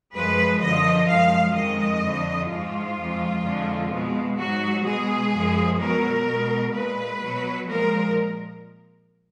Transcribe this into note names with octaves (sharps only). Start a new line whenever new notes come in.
F#2 F3 G#3 B4
F#2 D3 F3 D#5
F#2 F3 G#3 F5
F2 D#3 G#3 D#5
F2 D3 F3
G#2 F3 G#3 F4
F2 F3 G#3
F2 D3 F3 G#3
B2 G#3
G#2 F#3 F#4
B2 G#3 G#4
F#2 F3 G#3
B2 F#3 A#4
B2 G#3
A#2 G#3 B4
B2 F#3
A#2 F3 G#3 A#4